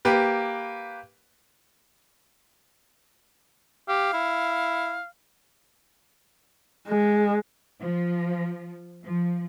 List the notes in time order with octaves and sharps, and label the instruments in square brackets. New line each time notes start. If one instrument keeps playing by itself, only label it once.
[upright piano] A#3 G4 B4
[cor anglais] G4 [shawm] F5
[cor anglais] E4
[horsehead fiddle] G#3
[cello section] F3
F3